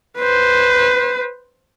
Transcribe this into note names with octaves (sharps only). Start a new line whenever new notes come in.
B4 C5